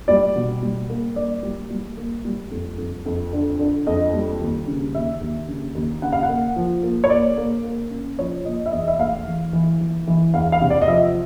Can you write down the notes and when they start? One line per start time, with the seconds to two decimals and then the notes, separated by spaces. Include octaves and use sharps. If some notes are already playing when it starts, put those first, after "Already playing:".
0.08 G3 D5
0.36 B2
0.62 G3
0.90 A#3
1.16 A#3 D5
1.43 G3
1.70 G3
1.97 A#3
2.25 G3
2.51 F2
2.78 F2
3.06 F2
3.33 D3
3.59 D3
3.87 F2 D#5
4.13 G3
4.41 D#2
4.67 C#3
4.95 D#2 E5
5.21 D#2
5.48 C#3
5.75 D#2
6.02 C#3 F#5
6.12 F5
6.23 F#5
6.29 A#3
6.56 F3
6.83 A#3
7.04 C#5
7.10 A#3 D5
7.38 A#3
7.64 A#3
7.91 C#4
8.19 F3 C#5
8.45 A#2 D#5
8.66 E5
8.72 E2 D#5
8.88 E5
8.99 A3 F5
9.26 E3
9.53 E3
9.81 E3
10.07 E3
10.34 E2 F5
10.52 F5
10.61 C3
10.70 D5
10.82 D#5
10.88 F3 E5